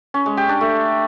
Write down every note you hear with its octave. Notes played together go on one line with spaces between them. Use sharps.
C#4
G#3
G4
D4
A3